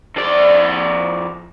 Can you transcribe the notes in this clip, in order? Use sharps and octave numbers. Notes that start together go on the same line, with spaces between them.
F2 D5